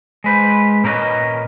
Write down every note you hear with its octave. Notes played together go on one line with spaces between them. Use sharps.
G#3 B4 C5
A#2 A#3 C#4 A#4 B4 D#5